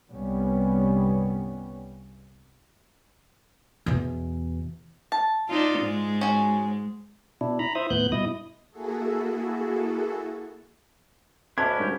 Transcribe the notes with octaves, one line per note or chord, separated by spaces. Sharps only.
C2 G2 G3 B3 C#4
E2 B2
A5
D4 D#4 F4
G#2 G#3
C#4 F#4
B2 D4 E4
A#5 B5
E4 C5 E5 D#6
D#2 A2 B3 F#6 G6
G2 B2 E4 D#5 D#6
A#3 E4 F#4 G#4 A4
D2 C#4 D4 E4 D#5 E5 A5 G#6
G2 A#4 G6